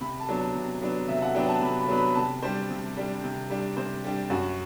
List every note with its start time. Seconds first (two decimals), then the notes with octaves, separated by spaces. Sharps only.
0.01 C3 B5
0.20 A5
0.29 F#3 B3 D4
0.38 A5
0.55 C3
0.82 F#3 B3 D4
1.08 C3 E5
1.22 F#5
1.34 F#3 B3 D4 G5
1.48 A5
1.62 C3 B5
1.80 B5
1.89 F#3 B3 D4
1.97 B5
2.15 C3 A5
2.43 G3 D4 C5
2.70 C3
2.97 G3 D4
3.24 C3
3.50 G3 D4
3.77 C3 C5
4.04 G3 D4
4.30 F#2 F#4